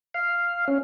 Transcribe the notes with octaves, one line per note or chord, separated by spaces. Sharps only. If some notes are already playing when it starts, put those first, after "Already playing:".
F5
C#4